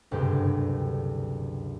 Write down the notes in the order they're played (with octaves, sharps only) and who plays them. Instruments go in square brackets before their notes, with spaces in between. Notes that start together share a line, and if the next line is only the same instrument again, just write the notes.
[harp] F#1 D2 G2 C3 G4 B4